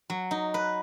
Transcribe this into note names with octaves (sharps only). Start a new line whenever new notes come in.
F#3
D#4
B4